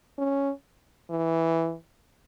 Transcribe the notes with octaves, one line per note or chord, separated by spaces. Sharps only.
C#4
E3